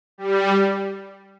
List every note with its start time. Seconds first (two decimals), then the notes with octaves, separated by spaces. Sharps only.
0.18 G3